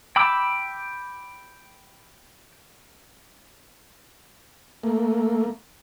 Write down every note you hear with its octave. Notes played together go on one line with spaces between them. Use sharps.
G5 B5 D6 E6
A3 A#3